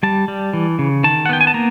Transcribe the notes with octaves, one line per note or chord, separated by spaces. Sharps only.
G3 A5
G3
E3
C#3
D#3 A5
F#5
B3 G5
G#5
A5
A#3 A#5